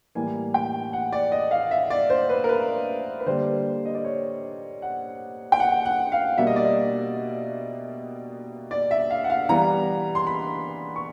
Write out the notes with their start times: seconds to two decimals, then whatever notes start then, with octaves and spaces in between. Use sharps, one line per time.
0.15 A2 E3 G3 A#3 G#5
0.54 G5
0.93 F#5
1.12 D5
1.32 D#5
1.51 F5
1.71 E5
1.90 D5
2.10 C5
2.29 B4
2.44 A#4
2.49 B4
3.20 B4
3.26 D3 G3 A#3 C5
3.86 D#5
3.95 D5
4.04 C#5
4.82 F#5
5.52 G5
5.60 F#5
5.86 F#5
6.12 F5
6.38 B2 G3 A#3 E5
6.47 D#5
6.56 D5
6.65 D#5
8.71 D5
8.91 E5
9.11 F5
9.24 F#5
9.30 F5
9.49 E3 G3 B3 A#5
10.15 C6
10.27 B5
10.96 C#6